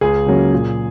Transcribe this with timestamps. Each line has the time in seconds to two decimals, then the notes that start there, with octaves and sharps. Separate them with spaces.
0.01 C#2 G#4
0.26 C#3 F#3 A#3 C#4
0.53 A#2